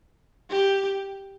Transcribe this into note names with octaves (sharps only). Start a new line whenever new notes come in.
G4